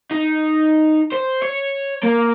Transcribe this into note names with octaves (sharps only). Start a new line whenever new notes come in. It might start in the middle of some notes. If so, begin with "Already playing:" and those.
D#4
C5
C#5
A#3